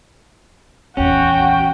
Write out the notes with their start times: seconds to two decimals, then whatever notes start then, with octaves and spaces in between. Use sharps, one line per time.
0.97 A#1 E2 C#4 F#4 G5